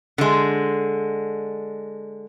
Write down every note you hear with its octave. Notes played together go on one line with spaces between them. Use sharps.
D3 G#3